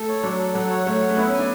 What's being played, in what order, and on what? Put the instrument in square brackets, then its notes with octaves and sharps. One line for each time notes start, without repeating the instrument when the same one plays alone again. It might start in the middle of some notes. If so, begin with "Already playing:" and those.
Already playing: [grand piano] A3 [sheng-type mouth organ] A4
[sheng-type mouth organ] C#5
[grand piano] F#3 [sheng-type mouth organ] D4
[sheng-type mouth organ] A4
[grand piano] F#3 [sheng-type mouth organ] F#5
[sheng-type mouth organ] C#5
[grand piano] A3 [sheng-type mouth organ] C#5
[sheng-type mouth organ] F#5
[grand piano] A3
[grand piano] B3 [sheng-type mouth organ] E4
[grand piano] C#4
[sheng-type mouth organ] G#5
[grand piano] D4